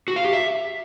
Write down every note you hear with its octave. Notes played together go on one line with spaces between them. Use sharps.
F#4
F5
G4
E5